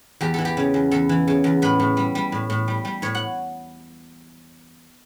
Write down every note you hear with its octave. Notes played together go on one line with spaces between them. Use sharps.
E2 G4
E3 A4
G4
C#3
E2
E2 A4
E3
C#3
E2
A2 B4
A2
G3
G3
A2
A2
G3
G3
A2 C#5
F#5